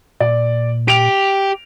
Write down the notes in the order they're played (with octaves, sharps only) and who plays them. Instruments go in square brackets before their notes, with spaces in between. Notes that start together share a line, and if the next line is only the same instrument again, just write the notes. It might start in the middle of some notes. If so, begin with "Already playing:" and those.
[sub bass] A#2 [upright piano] D5
[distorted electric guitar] G4 [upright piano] D7 F7